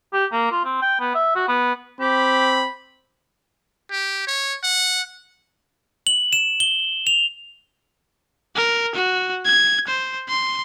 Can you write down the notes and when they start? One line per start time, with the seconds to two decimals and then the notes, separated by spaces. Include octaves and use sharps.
0.13 G4
0.32 A#3
0.51 F4
0.64 C4
0.82 G5
1.00 B3
1.15 E5
1.35 F#4
1.48 B3
2.00 C4 G4 B5
3.91 G4
4.27 C#5
4.63 F#5
6.07 F#7
6.33 E7
6.60 G7
7.07 F7
8.56 A#4
8.95 F#4
9.45 G#6
9.88 C5
10.28 C6